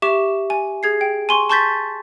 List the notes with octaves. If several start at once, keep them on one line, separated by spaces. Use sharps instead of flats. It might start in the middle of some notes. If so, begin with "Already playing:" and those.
G4 E5 C#6 D6 E7
G#5
G#4 G#6 C7
G5
G#5 C6 C#6
A5 C6 C#6 G6 A6 B6